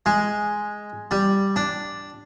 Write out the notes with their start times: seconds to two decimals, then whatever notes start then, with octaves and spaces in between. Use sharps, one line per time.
0.06 G#3
1.11 G3
1.56 D4